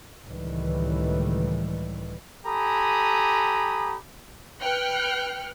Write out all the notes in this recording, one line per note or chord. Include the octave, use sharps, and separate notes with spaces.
C#2 A2 D#3 E3 G3
G4 A4 G#5 A#5 B5 D#6
B4 G5 F6 F#6 C#7